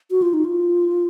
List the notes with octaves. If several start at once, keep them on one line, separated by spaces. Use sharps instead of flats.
F#4
F4
D#4
F4